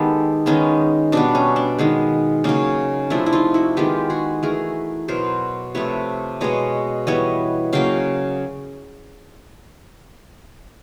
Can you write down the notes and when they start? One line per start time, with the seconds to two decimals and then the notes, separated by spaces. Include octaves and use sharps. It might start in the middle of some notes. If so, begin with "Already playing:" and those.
Already playing: D#3 G#3 B3 G4 A4
0.46 D#3 G#3 B3 C#4 D#4
1.12 B2 G3 B3 D4
1.35 C#4
1.56 D4
1.78 D#3 G#3 B3
2.44 C#3 F#3 A#3 C#4 D#4
3.10 C3 F3 A3 D4 E4
3.26 E4
3.33 D#4 F4
3.54 E4 F#4
3.77 D#3 G#3 B3 F4 G4
4.10 F#4 G#4
4.43 E3 A3 G#4 A#4
5.08 B2 F#3 B3 A#4 C5
5.74 C3 F3 A3 B4 C#5
6.41 B2 G#3 B3 C#5 D#5
7.07 E3 G3 B3 C#5 D#5
7.73 C#3 F#3 A#3 F5 G5